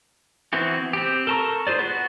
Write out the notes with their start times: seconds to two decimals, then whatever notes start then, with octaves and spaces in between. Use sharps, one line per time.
0.53 E3 B3 C4 E4 F#4
0.93 C4 G4
1.27 A4 A#4 A5 A#5 C#6
1.67 F4 G#4 C5 D5
1.79 B3 F#4